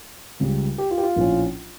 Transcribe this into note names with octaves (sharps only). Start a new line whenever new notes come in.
C#2 C#3 G3
G4
F4
G4
F4
A#1 A2 F3 C#4